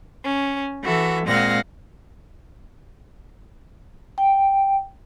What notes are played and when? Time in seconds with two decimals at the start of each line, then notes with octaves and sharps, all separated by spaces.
0.25 C#4
0.82 E3 F#4 A4 E5
1.26 A#2 G#3 C4 F5 F#5 A#6
4.18 G5